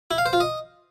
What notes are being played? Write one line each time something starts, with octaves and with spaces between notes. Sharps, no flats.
E4
F5
C5
F4
D#5